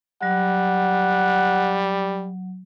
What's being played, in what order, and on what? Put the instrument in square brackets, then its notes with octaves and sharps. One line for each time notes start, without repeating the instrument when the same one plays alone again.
[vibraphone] F#3 [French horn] G3 [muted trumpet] F#5